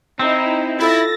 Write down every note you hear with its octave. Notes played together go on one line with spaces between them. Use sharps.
C4 D#4 E4
E4 F4 A4 E6 A6 A#6